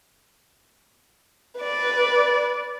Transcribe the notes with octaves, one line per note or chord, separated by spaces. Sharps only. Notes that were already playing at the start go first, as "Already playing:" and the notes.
B4 D5